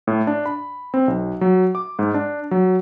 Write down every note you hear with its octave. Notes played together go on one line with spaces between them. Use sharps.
A2
D4
B5
C4
B1
F#3
D6
G#2
D4
F#3